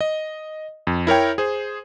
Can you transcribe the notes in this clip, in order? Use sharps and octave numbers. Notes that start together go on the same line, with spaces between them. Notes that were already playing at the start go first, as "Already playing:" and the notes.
D#5
F2
E4 A#4 C#5 G5
G#4 C5